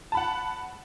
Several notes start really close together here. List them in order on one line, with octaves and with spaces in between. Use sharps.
A5 B5 F#5